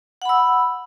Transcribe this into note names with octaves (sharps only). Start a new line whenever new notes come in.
F#5 B5 E6